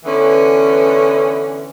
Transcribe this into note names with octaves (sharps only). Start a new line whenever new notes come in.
D3 E3 B3 C#4